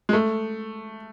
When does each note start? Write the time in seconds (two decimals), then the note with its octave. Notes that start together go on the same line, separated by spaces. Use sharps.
0.09 G#3
0.13 A3